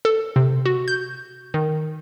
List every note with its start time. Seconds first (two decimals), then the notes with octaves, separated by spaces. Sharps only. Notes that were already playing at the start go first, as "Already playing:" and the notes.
0.05 A4
0.36 C3
0.66 F#4
0.88 G6
1.54 D#3